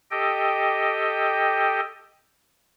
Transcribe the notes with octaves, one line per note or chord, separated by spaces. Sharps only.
G4 A4 D#5 G5